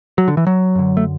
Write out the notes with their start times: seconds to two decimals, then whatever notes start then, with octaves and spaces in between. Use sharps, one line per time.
0.18 F#3
0.28 D3
0.37 E3
0.47 F#3
0.75 F#2 D3
0.97 A3